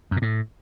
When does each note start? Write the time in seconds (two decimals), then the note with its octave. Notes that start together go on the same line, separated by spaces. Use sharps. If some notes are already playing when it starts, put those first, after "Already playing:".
0.11 F#2
0.17 A#2
0.22 A2